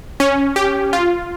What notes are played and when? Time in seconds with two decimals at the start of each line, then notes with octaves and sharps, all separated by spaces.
0.20 C#4
0.56 G4
0.93 F4